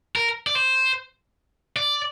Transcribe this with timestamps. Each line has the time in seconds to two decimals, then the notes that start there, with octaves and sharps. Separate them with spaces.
0.16 A#4
0.47 D5
0.55 C5
1.76 D5